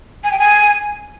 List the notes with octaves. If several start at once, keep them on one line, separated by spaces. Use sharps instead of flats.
G#5
G5
G#5